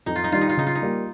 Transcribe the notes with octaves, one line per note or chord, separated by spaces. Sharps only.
F2 D#4
F4
D#4
D#3 G3 F4
D#4
F4
C#3 D#4
F4
D#4
G3 A#3